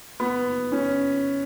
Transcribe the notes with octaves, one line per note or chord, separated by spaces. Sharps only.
B3
C#4